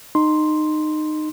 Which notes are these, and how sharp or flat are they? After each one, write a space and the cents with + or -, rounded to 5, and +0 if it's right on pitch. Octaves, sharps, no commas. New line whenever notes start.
D#4 -20 C6 +0